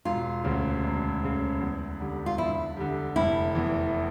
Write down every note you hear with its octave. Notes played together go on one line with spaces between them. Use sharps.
E1 F4
D2 C#3
E1
D2 C#3
E2
D3 G3
F4
E2 E4
D3 G3
F1 E4
E2 E3